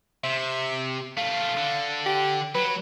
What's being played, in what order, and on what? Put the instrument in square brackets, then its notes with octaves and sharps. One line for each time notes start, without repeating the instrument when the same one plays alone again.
[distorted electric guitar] C3 [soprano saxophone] E5
[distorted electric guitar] A3 F4 [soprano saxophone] F5
[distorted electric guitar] D3
[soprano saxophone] G4
[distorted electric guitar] F#3 [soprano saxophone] B4